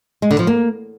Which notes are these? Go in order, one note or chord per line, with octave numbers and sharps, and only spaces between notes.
G#3
D3
F3
A#3